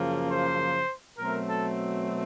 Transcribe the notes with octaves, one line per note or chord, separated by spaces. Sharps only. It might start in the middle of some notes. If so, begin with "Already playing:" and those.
Already playing: F#2 C#3 F3 A#3
C5
B2 F#3 A3 C4 A#4
A4